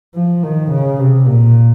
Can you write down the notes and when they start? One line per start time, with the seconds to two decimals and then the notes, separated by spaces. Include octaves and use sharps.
0.15 F3
0.43 D#3
0.71 C#3
0.99 C3
1.27 A#2